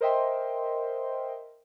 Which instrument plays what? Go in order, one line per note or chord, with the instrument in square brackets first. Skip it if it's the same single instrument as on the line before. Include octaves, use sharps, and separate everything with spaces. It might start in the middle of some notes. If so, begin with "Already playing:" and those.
[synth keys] A#4 C5 D#5 E5 G5 C6